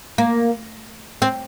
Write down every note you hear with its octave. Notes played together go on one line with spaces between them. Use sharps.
A#3
C4